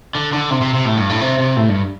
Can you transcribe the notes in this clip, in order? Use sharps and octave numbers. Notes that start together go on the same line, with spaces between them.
D3
D3
C3
C3
C3
A2
G2
A2
C3
C3
A2
G2